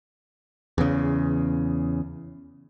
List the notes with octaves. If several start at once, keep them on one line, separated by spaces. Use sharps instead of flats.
E2 C#3